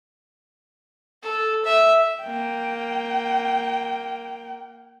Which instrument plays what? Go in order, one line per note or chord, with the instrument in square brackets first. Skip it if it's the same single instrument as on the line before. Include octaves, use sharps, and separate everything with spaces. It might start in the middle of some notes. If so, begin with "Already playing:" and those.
[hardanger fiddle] A4
E5
[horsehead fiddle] A#3 G5